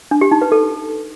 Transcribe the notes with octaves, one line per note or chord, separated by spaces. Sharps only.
D4
G4
D#4
B4
A4